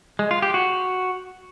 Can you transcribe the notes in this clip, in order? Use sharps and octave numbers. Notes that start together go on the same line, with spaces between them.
G#3
F4
G4
F#4